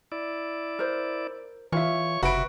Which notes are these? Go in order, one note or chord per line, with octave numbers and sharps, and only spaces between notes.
E4 D5
A#4 C5
E3 F4 C#5 E5 C#6
F#1 C3 F#4 B4 E5 B5 D7